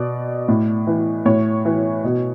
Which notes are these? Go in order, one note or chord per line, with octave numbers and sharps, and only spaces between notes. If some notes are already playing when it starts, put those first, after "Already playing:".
Already playing: B2 D5
A2
E3
A2 C#5
E3
B2